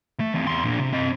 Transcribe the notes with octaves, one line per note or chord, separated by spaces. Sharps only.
A3
E3 C4
E2 C6
A#2 D4
C3
C4 D#5